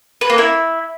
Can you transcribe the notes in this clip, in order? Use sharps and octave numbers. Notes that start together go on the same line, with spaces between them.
B4
A#3
E4